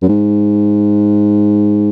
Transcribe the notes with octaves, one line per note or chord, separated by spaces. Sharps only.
F#2
G#2